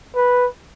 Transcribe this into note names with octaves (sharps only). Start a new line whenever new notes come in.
B4